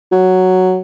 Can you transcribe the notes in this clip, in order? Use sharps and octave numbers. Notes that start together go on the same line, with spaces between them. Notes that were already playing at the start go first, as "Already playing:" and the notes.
F#3